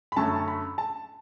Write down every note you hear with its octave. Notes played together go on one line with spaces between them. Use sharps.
B5
F#2 D3 A3 C#4 A5
A5
B5
A5